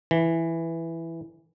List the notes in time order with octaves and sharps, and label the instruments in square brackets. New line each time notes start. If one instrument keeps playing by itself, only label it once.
[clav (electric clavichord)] E3